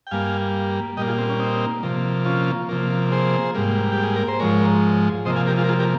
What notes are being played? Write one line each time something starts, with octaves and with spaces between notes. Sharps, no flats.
G5
G2 G3 A#3 F5 G#5
A#2 G3 A#3 D#5 G5
F4 G#4
C4
C#4
C4 D#4
C3 F3 A#3
C#4 F4
C3 F3 A#3
G#4 C5
G#2 G3 A#3
G4
G#4
A#4
C5
G#2 F3 G#3 A#4 C#5
C3 F3 A#3 C5 D#5
F5 G#5
G4 A#4
F4 G#4
A#4
F4 G#4
G4 A#4